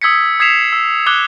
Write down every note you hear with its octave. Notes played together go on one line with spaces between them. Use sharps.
D#6 E6 G#6 B6 C#7
D#6 G#6 B6 C7 E7 F7
E6
D6 D#6 F#6 G#6 G7